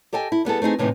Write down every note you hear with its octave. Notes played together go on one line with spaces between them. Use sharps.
G4 A4 D#5 G5 G#5
E4
G3 B3 G#4 A4
A3 C4 D#4 G#4
A2 C3 E3 B3 D#4